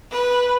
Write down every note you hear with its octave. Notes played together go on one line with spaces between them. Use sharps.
B4